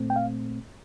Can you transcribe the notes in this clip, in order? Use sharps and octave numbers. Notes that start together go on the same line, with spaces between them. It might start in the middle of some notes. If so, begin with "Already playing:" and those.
Already playing: A#2 A3 C4
G5
F5